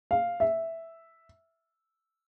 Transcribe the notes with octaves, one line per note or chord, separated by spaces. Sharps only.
F5
E5